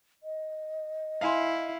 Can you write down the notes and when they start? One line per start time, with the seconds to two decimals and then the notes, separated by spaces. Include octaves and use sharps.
0.23 D#5
1.21 E4 F5 G#5 C6